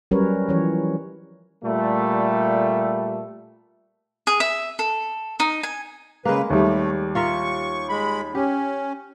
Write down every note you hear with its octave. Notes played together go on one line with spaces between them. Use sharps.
F#3 G3 C#4 A#4 B4 C#5
E3 F3 C#4 C#5
A#2 G3 A3
G#4
E5
A4
D#4
G#5
C#3 G#3 A#3 B4
D#2 G3 A3
F4 A#4 E5 C#6
G#3 B5
C#4 G4